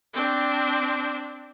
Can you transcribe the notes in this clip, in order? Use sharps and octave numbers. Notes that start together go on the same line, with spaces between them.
C4 D4